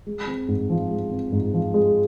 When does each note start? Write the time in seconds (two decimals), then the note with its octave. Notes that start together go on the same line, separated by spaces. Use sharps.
0.06 G#3
0.27 C4
0.48 G#2
0.70 F3
0.91 G#3
1.11 C4
1.32 G#2
1.53 F3
1.74 G#3